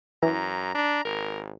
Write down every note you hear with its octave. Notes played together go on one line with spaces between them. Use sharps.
F#2 E3 A#5
D4 A#5
G#1 A#4